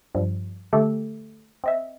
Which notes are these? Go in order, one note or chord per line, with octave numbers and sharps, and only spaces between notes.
G2 F3 G3
D3 A3 G4 A4
C4 D#5 E5